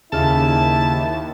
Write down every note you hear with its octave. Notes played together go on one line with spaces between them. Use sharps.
D#2 C#3 E4 A5 F6